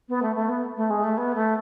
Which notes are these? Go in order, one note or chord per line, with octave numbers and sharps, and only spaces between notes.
B3
A3
A3
B3
A3
G#3
A3
B3
A3